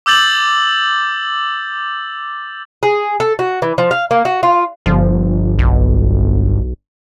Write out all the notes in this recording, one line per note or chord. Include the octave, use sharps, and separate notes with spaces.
D6 E6 G6 A6 F#7
G#4
A4
F#4
E3
F3
F5
A#3
F#4
F4
G1 F3
B1